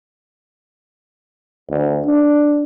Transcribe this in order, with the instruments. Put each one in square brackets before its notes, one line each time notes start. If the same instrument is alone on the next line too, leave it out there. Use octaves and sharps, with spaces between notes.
[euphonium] D2
D4